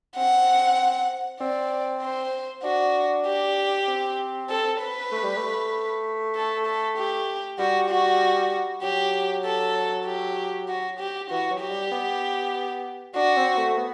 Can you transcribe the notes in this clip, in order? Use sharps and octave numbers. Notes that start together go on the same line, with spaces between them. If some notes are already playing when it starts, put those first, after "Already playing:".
C4 F#5
C4 D5
C5
D4 F#4
G4
C4
A4
B4
A3
G3
A3
A4
A4
G4
G3 F#4
F#4
F#3 G4
A4
G4
F#4
G4
E3 F#4
F#3
G4
G3
B3
D4 F#4
C4
A3
B3